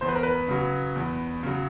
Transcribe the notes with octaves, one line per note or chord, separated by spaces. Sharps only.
E2 C5
B4
A#4
B4
C#3 F#3
E2
C#3 F#3